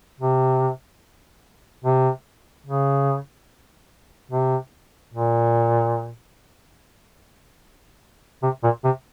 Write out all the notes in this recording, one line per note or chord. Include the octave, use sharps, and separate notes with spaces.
C3
C3
C#3
C3
A#2
C3
A#2
C3